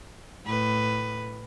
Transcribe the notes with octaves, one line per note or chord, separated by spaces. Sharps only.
A2 B4